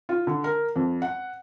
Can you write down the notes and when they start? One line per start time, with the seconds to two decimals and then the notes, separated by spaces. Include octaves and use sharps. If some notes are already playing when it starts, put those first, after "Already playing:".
0.09 F4
0.27 D3
0.44 A#4
0.76 F2
1.02 F#5